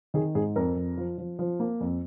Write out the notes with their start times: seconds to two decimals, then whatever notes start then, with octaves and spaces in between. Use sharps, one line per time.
0.14 D#3 G#4
0.35 G#2 G#4
0.56 F2 A#4
0.76 F2
0.97 F3
1.18 F3
1.39 F3
1.60 A#3
1.80 F2